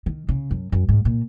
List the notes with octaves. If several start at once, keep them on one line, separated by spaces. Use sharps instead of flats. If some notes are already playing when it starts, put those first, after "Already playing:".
D#3
C#3
F#2
F#2
G#2
A#2